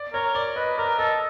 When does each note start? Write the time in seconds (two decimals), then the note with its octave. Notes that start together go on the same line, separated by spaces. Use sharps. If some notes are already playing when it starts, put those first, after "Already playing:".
Already playing: D5
0.13 A#4 C#5
0.35 D5
0.56 B4 D#5
0.78 A#4 D5
0.98 A4 D#5